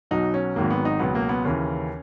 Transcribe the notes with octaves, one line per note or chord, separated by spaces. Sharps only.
B1 B2 F#3 D#4
C#4
G#1 G#2 D#3 F#3 A#3
B3
D#4
C#2 B2 F#3 B3
A#3
B3
D#2 C#3 E3 C#4